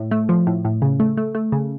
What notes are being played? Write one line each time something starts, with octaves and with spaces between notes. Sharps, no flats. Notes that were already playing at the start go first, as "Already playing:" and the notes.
Already playing: A2
A3
F3
A2
A2
C#3
A3
A3
A3
C#3